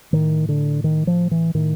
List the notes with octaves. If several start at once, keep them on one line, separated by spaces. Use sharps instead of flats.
A2 D#3
D3
D#3
F3
E3
A2 D#3